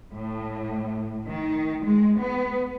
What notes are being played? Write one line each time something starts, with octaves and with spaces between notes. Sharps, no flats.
A2
D#3
G#3
B3